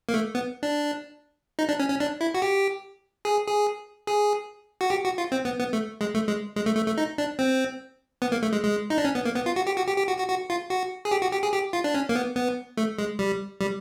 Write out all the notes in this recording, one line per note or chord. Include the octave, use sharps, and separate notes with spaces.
A#3
A3
B3
D4
D#4
D4
C#4
C#4
D4
E4
F#4
G4
G#4
G#4
G#4
F#4
G4
F#4
F4
C4
B3
B3
A3
G#3
A3
G#3
G#3
A3
A3
A3
D#4
D4
C4
B3
A#3
A3
G#3
G#3
D#4
D4
C#4
B3
A#3
B3
F4
F#4
G4
F#4
G4
G4
F#4
F#4
F#4
F4
F#4
G#4
G4
F#4
G4
G#4
G4
F4
D4
C#4
A#3
B3
B3
A3
G#3
G3
G3